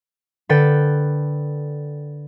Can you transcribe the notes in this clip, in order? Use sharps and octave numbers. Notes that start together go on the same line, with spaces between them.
D3 A4 B4 G5 A6